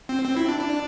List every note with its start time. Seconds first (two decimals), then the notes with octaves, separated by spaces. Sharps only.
0.09 C4
0.25 C4
0.36 E4
0.48 D4
0.60 D4